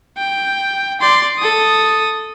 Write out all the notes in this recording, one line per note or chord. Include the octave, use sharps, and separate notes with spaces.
G5
D5 C6
A4 D#6